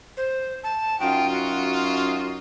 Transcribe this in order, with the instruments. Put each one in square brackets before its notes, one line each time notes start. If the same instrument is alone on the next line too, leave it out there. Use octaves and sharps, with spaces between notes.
[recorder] C5
A5
[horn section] F#2 D#4 F4 [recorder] G5
[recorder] F#4